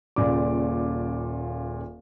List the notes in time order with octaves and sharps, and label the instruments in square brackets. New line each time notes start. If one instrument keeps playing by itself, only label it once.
[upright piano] D#1 A#2 C#3 D5 D6